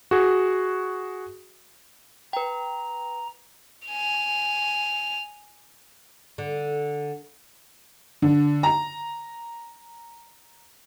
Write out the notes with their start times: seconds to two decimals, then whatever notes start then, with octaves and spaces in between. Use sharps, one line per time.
0.11 F#4 G#4
2.33 B4 G5 A#5
3.87 G#5 F7
6.38 D3
8.22 D3
8.63 A#5